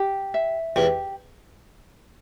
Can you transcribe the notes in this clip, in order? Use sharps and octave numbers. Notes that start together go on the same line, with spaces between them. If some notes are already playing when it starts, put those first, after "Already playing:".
Already playing: G4
E5
E2 E3 G4